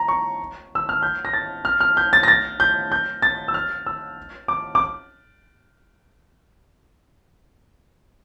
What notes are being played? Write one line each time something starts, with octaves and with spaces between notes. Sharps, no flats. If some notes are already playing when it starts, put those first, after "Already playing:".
Already playing: A#5
C#6
E6
F6
G6
A#6
A6
F6
F6
G6
A6
A#6
A6
G6
G6
A6
E6
F6
E6
D6
D6